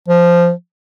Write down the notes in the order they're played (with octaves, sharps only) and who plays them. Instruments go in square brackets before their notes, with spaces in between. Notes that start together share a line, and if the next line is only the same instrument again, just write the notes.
[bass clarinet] F3